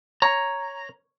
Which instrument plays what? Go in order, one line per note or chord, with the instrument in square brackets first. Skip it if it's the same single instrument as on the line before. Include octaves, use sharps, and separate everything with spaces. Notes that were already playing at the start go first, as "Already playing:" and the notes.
[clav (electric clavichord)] C#5 [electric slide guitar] A#5